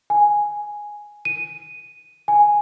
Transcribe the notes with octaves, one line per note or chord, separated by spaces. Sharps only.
G#5
D#7
G#5